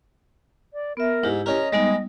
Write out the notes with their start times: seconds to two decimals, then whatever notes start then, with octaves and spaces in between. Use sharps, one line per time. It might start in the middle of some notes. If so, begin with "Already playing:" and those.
0.74 D5
0.97 B3 A#4 E5
1.23 G#2 E4 G4
1.46 C#4 A#4 D#5
1.72 G3 G#3 B3 D#4